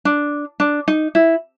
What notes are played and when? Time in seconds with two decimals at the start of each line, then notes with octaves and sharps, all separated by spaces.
0.05 D4
0.60 D4
0.88 D#4
1.15 E4